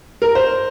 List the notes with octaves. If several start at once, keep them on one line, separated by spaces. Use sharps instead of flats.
A#4
C5